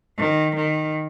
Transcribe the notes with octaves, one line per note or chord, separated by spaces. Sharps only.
D#3
D#3